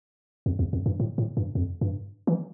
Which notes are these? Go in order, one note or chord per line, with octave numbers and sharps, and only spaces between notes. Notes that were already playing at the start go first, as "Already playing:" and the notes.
F2
E2
F2
G2
A2
A2
G2
F2
G2
E3